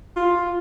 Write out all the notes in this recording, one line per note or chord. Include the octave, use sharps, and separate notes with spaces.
F4